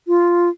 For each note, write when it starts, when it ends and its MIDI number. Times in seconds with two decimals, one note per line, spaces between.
0.08 0.49 65